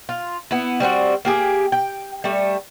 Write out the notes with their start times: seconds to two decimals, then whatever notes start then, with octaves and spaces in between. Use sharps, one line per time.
0.09 F4
0.51 B3 E4
0.80 G3 C4 D#4 F#4
1.25 A#3 G4 G#4
1.72 G5
2.24 G3 A3